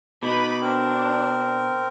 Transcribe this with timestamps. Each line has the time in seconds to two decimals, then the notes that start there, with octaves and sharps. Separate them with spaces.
0.23 B2 D#4 B4 B5 D6
0.61 C4 D4 A#4